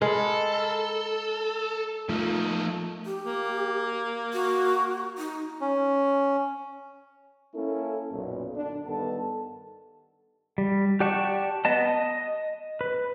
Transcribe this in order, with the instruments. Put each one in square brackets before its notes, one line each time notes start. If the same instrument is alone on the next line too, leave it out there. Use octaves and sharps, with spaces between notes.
[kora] G#3 [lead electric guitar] A4 [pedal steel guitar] A#4 B5
[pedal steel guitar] F3 D#4 [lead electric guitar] A3 A#3
[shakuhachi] G4
[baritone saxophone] A#3
[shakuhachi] F#4
D#4
[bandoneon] C#4
[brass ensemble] A#3 C#4 E4 A4
B1 F#2 A#2
D3 D4
G2 D#3 B3 A4 A5
[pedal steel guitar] G3
G4 D5 F#5 A5 C#6
B3 D#5 A5
D#5
B4